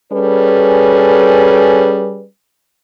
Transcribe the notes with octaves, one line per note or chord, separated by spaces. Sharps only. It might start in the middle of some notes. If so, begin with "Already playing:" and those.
G3 C#4 G#4 A4 B4